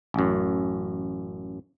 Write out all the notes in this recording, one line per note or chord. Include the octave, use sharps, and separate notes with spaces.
A1 F#2